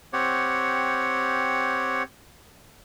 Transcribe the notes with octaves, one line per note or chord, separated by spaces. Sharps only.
C4 G4 C#5 F#5